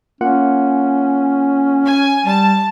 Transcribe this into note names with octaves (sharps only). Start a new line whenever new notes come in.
A#3 C#4 F4 F#5
G#5
G3 A5